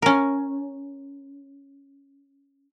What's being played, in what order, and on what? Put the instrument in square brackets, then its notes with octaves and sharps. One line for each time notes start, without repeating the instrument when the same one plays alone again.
[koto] C#4 A#4